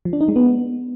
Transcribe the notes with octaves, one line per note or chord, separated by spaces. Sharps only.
F3
D4
D#4
G#3
B3